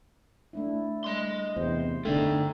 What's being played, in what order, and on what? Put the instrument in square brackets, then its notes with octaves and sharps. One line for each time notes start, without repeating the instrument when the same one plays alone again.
[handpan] A3 D4 E4
[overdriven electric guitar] D#5 C6
[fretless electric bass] E2 C3 [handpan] C5
[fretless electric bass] D3 A3 [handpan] D#4 [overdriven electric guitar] A4 G5